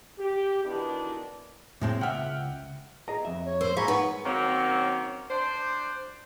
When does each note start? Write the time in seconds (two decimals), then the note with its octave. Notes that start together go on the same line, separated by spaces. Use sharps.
0.19 G4
0.64 B2 D#3 E3 B3 D4 E4
1.81 A2 G#3 C4
2.01 C#2 E5 F#5 G5 F6
3.08 G#4 D#5 A#5
3.25 F2 E5
3.45 C#5
3.61 A#4 C5 C6
3.77 G#2 G#4 C#5 F5 A#5 B5 C#6
3.88 D#4 B4 F#5 C#6
4.24 D#3 F#3 A#3 C4 C#4
5.29 D4 C5